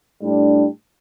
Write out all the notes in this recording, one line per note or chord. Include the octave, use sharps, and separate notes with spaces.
A2 G3 D4